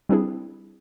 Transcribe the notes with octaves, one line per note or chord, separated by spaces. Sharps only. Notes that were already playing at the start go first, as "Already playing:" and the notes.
G3 C4 D4 E4 G#4